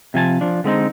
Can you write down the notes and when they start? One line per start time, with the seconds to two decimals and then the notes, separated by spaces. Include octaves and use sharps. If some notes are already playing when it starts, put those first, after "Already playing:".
0.14 C3 F3 G#5 A5
0.41 F3 D4
0.64 D3 G#3 C4 D#4